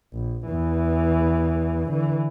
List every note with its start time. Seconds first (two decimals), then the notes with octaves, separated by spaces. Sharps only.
0.13 A#1
0.47 E2 E3
1.89 D3 E3